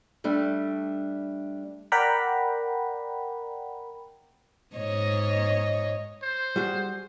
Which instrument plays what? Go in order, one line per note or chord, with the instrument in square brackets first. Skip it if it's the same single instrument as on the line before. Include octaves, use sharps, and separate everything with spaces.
[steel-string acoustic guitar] G3 A3 D4
[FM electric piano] A#4 D5 F#5 G5 A#5 B5
[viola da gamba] G#2 C#5 D#5
[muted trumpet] C5
[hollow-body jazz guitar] G3 F#4 G#4